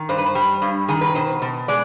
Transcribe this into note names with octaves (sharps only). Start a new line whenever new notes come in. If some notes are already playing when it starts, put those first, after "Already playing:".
Already playing: D#3
G2 C5
B4
C5
G3
G2
D#3 G#4
B4
B2 C5
B2
G#3 D5